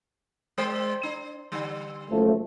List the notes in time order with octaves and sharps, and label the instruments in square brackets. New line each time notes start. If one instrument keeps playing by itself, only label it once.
[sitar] G#3 C5
D4
D3 G3
[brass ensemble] F#1 F3 A3